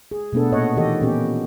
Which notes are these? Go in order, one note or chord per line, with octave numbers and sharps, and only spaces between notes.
G#4
B2 A3 B3 D4 A4
A#2 C#5 D#5 F#5
D#3 E3 G4 A4 D#5
A#2 B3 C#4 G4